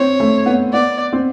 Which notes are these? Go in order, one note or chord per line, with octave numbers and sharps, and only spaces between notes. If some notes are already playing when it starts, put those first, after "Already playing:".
Already playing: C4 C#5
A3
B3
B3 D5
C4